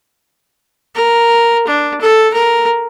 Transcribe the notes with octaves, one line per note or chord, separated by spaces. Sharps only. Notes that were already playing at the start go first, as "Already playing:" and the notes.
A#4
D4
A4
A#4